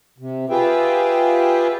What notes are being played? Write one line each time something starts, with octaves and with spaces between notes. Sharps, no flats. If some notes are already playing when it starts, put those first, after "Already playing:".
C3
F4 G4 G#4 B4 E5 G5